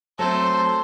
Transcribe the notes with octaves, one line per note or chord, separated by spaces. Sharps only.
F#3 A3 C4 A4 C5